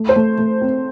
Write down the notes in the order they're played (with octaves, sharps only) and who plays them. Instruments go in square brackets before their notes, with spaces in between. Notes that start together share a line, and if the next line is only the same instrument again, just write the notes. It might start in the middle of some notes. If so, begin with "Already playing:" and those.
Already playing: [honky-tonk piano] A3
C5
A3
A3
C4